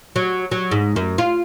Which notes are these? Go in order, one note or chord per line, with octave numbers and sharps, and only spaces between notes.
F#3
F#3
G#2
F#2
F4